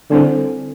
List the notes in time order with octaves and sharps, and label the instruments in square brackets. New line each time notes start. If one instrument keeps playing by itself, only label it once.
[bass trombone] D3 [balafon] G3 C4 E4 A4 C5